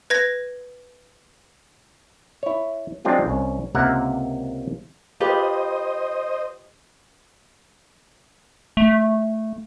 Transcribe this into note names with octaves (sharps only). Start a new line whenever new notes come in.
B4 G#6 A#6
E4 C#5
F#3 G#3 C4 D4 F4 G4
C2 C#4 C#5
C#2 C3 A#3 A#4 E5 F#5
F4 G4 B4 C5 D#5
A3